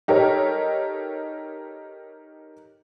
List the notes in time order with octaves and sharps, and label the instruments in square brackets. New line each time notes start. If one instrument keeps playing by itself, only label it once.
[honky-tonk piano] D#4 G4 A4 A#4 C#5